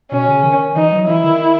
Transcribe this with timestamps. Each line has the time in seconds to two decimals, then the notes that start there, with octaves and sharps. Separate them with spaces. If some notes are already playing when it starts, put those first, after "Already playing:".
0.12 B2 C#4
0.28 C#3
0.44 D#3
0.76 E3 D#4
0.92 F#3
1.08 E3 E4
1.24 D#3